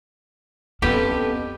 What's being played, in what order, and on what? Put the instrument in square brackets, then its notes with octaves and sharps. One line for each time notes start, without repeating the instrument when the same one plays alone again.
[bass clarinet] F2 [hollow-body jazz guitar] B3 A4 B4 [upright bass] C#4 D4 [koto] G4